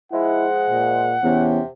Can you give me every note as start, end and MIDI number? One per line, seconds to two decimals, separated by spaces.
0.12 1.12 53
0.12 1.12 56
0.12 0.47 64
0.12 1.70 78
0.70 1.17 46
1.23 1.60 40
1.23 1.65 48
1.23 1.61 61